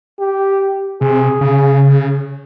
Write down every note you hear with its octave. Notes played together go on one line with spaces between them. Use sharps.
G4
C3 G#4
C#3